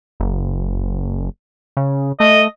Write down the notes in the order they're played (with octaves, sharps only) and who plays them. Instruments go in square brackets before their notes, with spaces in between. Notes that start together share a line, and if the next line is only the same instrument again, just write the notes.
[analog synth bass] F#1
C#3
[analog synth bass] A3 [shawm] D#5